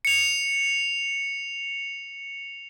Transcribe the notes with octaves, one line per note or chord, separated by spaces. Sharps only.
C#7 F7